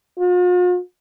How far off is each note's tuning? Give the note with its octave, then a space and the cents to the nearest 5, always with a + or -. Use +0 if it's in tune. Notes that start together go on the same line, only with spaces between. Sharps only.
F4 +45